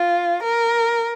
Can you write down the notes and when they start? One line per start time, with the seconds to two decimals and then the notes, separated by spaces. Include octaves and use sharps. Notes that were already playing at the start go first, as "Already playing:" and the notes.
Already playing: F4
0.41 A#4